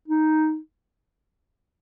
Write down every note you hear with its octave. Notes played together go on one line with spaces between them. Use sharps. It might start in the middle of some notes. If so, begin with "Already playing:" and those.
D#4